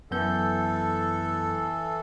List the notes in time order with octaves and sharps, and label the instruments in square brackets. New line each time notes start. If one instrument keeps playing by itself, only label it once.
[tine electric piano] F#2 B3 G6 [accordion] E3 A4